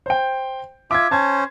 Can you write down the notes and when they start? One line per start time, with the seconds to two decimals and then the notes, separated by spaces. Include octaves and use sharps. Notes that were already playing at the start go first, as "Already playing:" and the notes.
0.06 C5 G5
0.91 F4 E5 D6 G#6
1.11 C#4 C5 A5 G#6